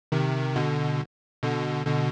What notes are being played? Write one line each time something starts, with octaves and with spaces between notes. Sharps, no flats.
C3 D#3
B2 D3
B2 D3
B2 D3